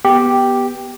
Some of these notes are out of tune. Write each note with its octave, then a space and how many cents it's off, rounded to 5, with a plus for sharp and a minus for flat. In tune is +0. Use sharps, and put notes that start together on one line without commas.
B3 -10 G4 +0